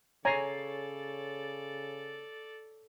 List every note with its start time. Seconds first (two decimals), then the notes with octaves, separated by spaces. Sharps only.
0.25 C#3 A4 C#5 D5 G#5 A#5 C7